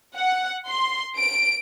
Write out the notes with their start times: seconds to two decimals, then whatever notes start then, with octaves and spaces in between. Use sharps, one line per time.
0.16 F#5
0.67 C6
1.16 D7